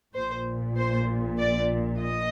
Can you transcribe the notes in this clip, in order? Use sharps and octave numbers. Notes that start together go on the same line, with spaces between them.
A#1 A#2 C5
C5
D5
D#5